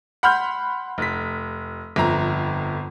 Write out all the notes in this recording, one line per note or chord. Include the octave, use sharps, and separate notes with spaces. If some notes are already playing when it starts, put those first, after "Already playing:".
F#5 B5 C6 F6 G6
F1 B6
G1 F2 A#5